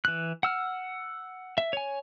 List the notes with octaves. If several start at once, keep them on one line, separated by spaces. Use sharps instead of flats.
E3 F#6
F#5 E6 F6
E5
C#5 G#5